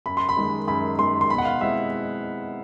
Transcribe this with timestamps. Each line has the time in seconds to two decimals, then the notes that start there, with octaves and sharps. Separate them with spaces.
0.06 F#2 B5
0.17 C6
0.29 B5
0.37 D#3 G#3
0.67 F#2 B5
0.99 D#3 G#3 C6
1.21 C6
1.30 B2 B5
1.38 F#5
1.45 F5
1.61 G#3 C4 E4 E5